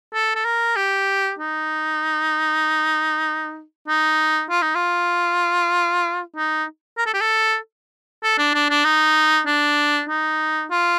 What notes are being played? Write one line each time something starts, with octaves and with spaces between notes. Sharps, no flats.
A4
A4
A#4
G4
D#4
D#4
F4
D#4
F4
D#4
A#4
A4
G4
A4
A4
D4
D4
D4
D#4
D4
D#4
F4